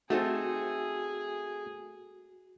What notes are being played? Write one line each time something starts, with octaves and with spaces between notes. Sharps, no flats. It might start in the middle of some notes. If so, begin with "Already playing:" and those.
A3 C4 D#4 F#4 G#4 A4 C5